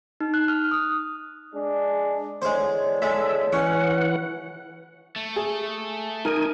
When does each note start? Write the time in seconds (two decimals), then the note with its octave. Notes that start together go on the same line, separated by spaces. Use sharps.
0.20 D#4
0.34 F#6
0.48 F6
0.71 D#6
1.53 G#3 D4
2.42 E2 D3 G#3 C5 C#5
3.02 G#3 A4 E5
3.53 E3 C#4 F#5
5.16 A3
5.36 G#4
6.25 D#4 A#4 G#5